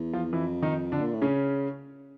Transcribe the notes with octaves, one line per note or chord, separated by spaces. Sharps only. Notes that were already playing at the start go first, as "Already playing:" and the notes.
Already playing: E2
F3 F4
F2 E3 E4
D#3 D#4
D3 D4
A#2
A2
C#3 C#4